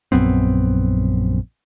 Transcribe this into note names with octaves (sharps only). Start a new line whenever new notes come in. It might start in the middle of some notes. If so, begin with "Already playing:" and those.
A#1 F#2 B3 C4